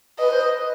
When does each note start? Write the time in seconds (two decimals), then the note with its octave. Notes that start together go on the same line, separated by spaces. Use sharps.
0.19 B4 D#5
0.31 C5
0.43 B4